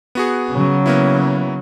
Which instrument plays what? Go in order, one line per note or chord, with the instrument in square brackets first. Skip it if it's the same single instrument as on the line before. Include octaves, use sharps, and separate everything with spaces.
[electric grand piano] B3 F#4 G#4
[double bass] C#3 F#3
[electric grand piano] A#3 B3 E4